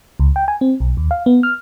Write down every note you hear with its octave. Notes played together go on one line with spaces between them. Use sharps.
C#2
G5
G#5
C4
B1
D#2
F5
B3
F6